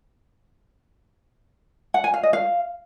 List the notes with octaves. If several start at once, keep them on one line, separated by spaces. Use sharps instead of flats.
F#5
G#5
F5
D#5
F5